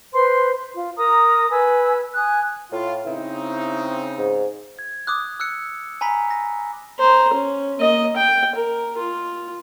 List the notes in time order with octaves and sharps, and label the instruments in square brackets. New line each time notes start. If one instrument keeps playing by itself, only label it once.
[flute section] B4 C5 C6
F4
A#4 A#5 D#6
B4 G#5 E6
G#5 D#6 F#6
[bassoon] A2 [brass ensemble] F4
[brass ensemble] C#3 C4 D#4 [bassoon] E4
[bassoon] G#2
[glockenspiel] G#6
D6 D#6 F#6
E6 F#6 C#7
G#5 A#5 B5 B6
A#6
[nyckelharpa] C5 A#5
C#4
A#3 D#5
G5
A#4
F4